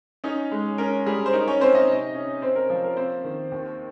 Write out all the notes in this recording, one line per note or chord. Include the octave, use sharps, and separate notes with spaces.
C#4 D#4 C#5
G#3
C#4 A#4
G3 G#4
C5
D#4 A#4
C#4 C#5
C4 C5
D#4 D#5
C3
C#4
C4 C5
A#4
F3
A#4
A#3 C4 C5
D#3
D#2